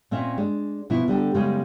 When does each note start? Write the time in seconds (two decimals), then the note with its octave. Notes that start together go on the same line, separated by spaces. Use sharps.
0.11 A#2 C4 C#4 D#5 E5
0.38 G#3 D4
0.90 B2 F3 B3 D#4 E4
1.08 D3 G3 G4
1.34 F#2 C#3 G3 G#3 B3 D#4